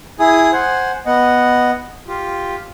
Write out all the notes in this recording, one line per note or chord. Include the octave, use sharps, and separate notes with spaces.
E4 G#4 G#5 D#6
C5 F#5 G#5
B3 D#5 F#5
F4 G4